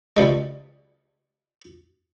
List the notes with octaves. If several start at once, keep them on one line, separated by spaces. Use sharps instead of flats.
C#2 G3 G#3